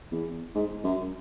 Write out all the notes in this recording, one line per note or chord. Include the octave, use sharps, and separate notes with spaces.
E2
G#2
F#2